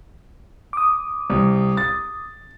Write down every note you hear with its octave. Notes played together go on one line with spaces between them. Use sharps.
D6 D#6
C2
A6